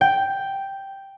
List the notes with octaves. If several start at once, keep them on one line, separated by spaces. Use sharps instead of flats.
G5